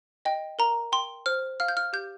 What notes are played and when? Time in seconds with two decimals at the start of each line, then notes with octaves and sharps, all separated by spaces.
0.25 D#5 G5
0.59 A#4 A#5
0.92 G5 C6
1.26 C5 F6
1.60 F5 F6
1.68 G6
1.77 F6
1.93 G4 G6